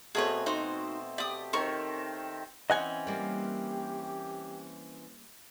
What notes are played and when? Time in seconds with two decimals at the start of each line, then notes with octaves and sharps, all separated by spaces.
0.15 B2 A3 C4 G#4 B4 C#5
0.46 D#4 F#4 C5
1.18 G4 D5 D#6
1.53 D#3 C4 A#4 C#5 C#6
2.70 E3 C4 C#4 D#5 F#5 G#5
3.07 G3 A#3 G4